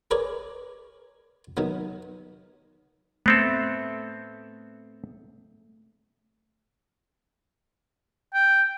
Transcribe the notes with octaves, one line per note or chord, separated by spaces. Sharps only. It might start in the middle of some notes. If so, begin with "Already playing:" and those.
G#4 A#4 B4 C#5 D5
D#3 F#3 B3
A3 B3 C4 A4
G5